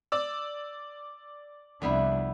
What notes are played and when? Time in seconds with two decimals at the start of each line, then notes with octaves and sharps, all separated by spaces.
0.12 D5 E6
1.82 C2 F2 B3 D4 E4